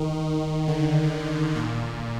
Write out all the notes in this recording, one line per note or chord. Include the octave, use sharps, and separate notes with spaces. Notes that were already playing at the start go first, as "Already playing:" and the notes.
Already playing: D#3
D3
A#2